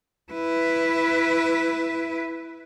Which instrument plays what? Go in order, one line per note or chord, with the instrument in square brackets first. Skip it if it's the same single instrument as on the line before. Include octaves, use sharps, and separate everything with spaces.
[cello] E4 B4